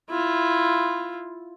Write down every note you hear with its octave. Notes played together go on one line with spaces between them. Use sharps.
E4 F4